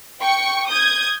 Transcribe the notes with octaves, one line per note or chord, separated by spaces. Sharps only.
G5 C#6 C#7
D#6 G6 G#6